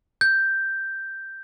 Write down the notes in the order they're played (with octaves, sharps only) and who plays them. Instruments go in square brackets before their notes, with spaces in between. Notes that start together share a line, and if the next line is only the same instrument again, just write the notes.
[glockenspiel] G6